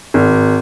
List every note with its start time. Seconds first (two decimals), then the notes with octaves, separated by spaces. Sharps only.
0.14 G#1